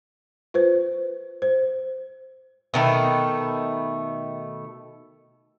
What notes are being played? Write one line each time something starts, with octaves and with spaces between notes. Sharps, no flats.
F4 B4 C5
C5
B2 D#3 A3